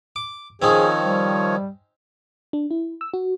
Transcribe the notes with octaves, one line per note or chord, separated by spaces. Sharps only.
D6
D#3 F3 C4 C#4 D#4 G#4 C#5
G3
D4
E4
E6
F#4